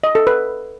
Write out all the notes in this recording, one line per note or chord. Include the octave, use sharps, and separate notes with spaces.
D#5
A4
B4